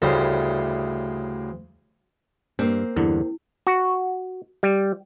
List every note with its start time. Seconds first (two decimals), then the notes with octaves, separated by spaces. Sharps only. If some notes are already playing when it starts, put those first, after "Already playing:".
0.02 D2 A2 C#3 G3 C5
2.59 G2 A#3 C4
2.96 E2 G2 D3 E4
3.67 F#4
4.63 G3